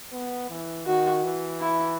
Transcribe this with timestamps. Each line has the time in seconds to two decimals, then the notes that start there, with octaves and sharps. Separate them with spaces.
0.12 B3
0.50 E3
0.86 D#3 F#4
1.24 E3
1.60 E4